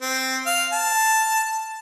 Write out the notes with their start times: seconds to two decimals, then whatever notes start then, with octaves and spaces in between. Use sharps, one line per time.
0.02 C4
0.46 F5
0.73 A5